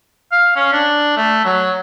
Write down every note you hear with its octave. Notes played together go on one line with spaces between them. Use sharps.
F5
C#4
D4
A3
F#3